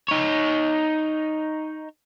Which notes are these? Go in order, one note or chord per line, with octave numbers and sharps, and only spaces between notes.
D#4 C#5